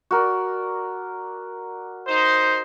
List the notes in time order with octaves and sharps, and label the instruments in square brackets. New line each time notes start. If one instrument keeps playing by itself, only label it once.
[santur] F#4 A#4 D5
[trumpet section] D#4 C5